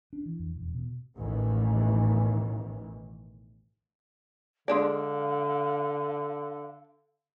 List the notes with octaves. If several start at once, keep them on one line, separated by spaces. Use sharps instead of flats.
D4
E3
F2
E1
B2
A1 D#2 B2 D#3 E3
D3 G#3 D4 D5 F5